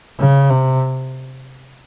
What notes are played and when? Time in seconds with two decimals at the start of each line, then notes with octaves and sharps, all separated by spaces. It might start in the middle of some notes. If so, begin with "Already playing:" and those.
0.19 C#3
0.50 C3